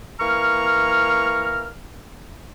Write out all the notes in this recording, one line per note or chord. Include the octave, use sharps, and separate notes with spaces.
E3 A#3 A#5 C#6 F6